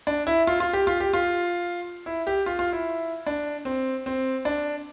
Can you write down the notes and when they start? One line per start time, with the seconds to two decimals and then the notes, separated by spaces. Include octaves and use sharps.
0.07 D4
0.27 E4
0.47 F4
0.60 F4
0.73 G4
0.87 F4
1.00 G4
1.13 F4
2.06 E4
2.27 G4
2.46 F4
2.59 F4
2.73 E4
3.27 D4
3.65 C4
4.06 C4
4.45 D4